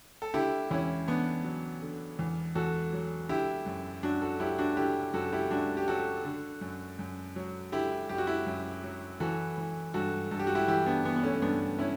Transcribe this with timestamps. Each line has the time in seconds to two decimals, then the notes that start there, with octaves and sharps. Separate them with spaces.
0.22 A4
0.34 D3 E4 G4
0.71 E2 C#4 E4
1.08 E2 B3 D4
1.44 F#3
1.82 D3
2.19 E2
2.55 E2 F#4 A4
2.93 F#3
3.29 D3 E4 G4
3.66 F#2
4.03 F#2 D4 F#4
4.22 F#4 A4
4.40 F#3 E4 G4
4.59 D4 F#4
4.77 D3 E4 G4
5.14 F#2 F#4 A4
5.32 E4 G4
5.50 F#2 D4 F#4
5.77 G4
5.87 F#3 F#4 A4
6.25 D3
6.61 F#2
6.99 F#2
7.36 F#3
7.72 D3 E4 G4
8.09 F#2 G4
8.18 F#4
8.27 E4 G4
8.46 F#2
8.83 F#3
9.20 E3 F#4 A4
9.58 E3
9.94 G2 F#4 A4
10.31 G2 A4
10.39 G4
10.47 F#4
10.55 E4 G4
10.68 E3 E4 G4
10.86 B3 D4
11.05 E3 B3
11.16 B3
11.23 A3 C#4
11.42 G2 B3 D4
11.79 C#4 E4